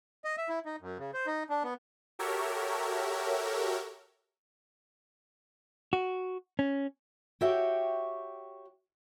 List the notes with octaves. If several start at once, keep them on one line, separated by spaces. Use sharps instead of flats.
D#5
E5
E4
D#4
F#2
C#3
C5
D#4
D4
B3
F#4 G4 A4 A#4 C#5 E5
F#4
C#4
F#4 G4 C#5 E5 G5